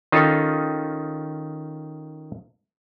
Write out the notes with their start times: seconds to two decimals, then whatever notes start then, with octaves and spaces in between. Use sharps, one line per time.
0.12 D#3 C#4 D#4 F4 A4